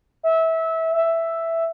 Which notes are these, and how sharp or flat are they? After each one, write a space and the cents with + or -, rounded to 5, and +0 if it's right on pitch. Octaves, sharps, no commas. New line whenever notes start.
E5 -20
E5 +5